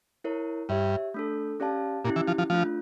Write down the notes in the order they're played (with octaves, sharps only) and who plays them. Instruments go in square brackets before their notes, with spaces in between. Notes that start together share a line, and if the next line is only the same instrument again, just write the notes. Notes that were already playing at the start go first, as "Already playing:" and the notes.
[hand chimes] E4 A#4 C#5
[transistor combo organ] G2 [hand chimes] G4 C#5 E5
[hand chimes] A3 D4 A4
C#4 G4 D5 F5 A5
[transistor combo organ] A#2 [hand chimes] C#4 E4 G4
[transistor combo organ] E3
F3
F3
[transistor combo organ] F3 [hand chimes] A3 D4 F4